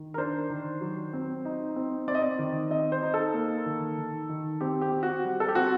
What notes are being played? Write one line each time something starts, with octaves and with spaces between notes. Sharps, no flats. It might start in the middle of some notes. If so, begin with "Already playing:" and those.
Already playing: D#3
A#4
D4 C5
D#3
F#3
C4
D#4
C4
C4 D5
D#5
D5
D#3
C4 D#5
C5
D#4
A4
A#3
D#3
D#3
D#3
C4 G4
G4
C4
F#4
G3
A4
G4
C4 F#4